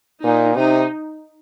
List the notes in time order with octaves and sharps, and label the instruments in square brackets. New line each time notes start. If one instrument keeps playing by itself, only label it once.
[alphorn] A#2 [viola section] D#4
[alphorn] C3 [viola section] D#4